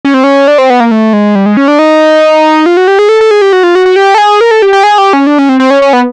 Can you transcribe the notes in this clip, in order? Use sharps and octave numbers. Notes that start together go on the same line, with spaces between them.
C#4
C4
C#4
D4
C4
B3
A#3
A3
G#3
G3
G#3
C#4
D4
D#4
F4
F#4
G4
G#4
A4
A4
G#4
G4
F#4
F4
F#4
F#4
G4
A4
G#4
A#4
A4
G4
G4
G#4
G4
C#4
D4
C#4
C4
C4
C#4
C#4
B3